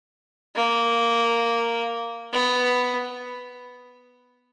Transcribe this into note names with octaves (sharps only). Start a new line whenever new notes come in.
A#3
B3